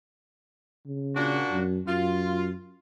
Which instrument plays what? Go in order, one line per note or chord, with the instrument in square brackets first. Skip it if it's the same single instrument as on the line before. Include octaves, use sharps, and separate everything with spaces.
[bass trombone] C#3
[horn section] A#2 D4 F#4
[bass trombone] F#2
[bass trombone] F#2 [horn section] F4